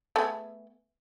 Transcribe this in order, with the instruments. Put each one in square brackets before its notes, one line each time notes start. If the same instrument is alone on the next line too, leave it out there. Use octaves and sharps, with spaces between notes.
[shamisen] A3 B3 G#4